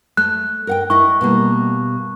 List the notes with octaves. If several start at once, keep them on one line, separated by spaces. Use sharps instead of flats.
A3 F#6
A#4 F#5 G5
E4 D#5 C#6
B2 G3 A#3